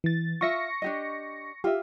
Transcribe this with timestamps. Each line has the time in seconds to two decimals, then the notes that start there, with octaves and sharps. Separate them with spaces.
0.04 E3 A6
0.41 F4 E5 C#6 A#6 C#7
0.82 D4 G4 D#5
1.64 F4 G4 E5